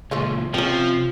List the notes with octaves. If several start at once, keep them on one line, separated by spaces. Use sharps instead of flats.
C#2 A#2 F3 A3 F4
C3 F3 C4 C#4 F4